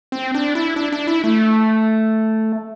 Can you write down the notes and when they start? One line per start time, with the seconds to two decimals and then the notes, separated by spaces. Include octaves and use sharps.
0.12 C4
0.34 D4
0.55 E4
0.76 D4
0.93 D4
1.07 E4
1.24 A3